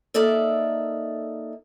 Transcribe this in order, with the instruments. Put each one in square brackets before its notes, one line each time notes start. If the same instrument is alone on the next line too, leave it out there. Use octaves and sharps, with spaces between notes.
[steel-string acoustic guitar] A#3 D#4 A4 D5 E5